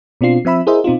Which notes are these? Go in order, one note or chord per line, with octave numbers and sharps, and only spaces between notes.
B2 C4 D4 F4 C7
F3 C4 E5 B5 E6
E4 G#4 A#4 C5 D#5 E5
B2 C4 D#4 F4